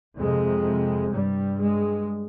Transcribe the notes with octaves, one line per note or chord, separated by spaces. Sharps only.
F2 C3 G#3
G2 G3
G#3